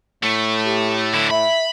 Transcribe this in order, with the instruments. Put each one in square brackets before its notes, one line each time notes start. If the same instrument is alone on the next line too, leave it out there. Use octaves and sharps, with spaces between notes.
[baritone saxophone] A2 [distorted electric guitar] A3
[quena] G4
[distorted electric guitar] D3 E4
[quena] E5 [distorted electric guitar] B5